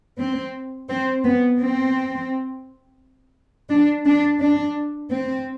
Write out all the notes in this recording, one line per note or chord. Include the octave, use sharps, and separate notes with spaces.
C4
C4
B3
C4
D4
D4
D4
C4